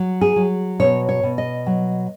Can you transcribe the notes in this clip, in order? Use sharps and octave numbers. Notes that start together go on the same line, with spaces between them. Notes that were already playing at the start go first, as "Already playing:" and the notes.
Already playing: F#3
G#4
F#3
B2 C#5
C#5
B2
D#5
F#3